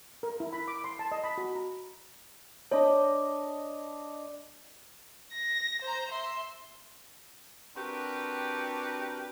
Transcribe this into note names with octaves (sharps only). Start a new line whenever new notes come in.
A#4
E4
B5
D6
C6
A5
D#5
B5
F#4
A#5
D4 C#5 D#5 B5
A#6
C5 A#5
E5 C6
C4 D4 F#4 G4 A#4 B4